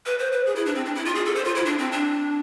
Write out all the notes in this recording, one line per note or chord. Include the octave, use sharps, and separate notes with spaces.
B4
C5
B4
G#4
E4
D4
C4
D4
E4
F4
G#4
A4
C5
F4
E4
D4
C4
D4